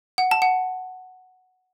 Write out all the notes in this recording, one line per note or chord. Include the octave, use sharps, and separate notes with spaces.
F#5
A5
F#5